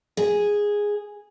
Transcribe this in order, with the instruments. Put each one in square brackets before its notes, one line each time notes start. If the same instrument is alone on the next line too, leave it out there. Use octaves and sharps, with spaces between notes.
[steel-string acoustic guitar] G#4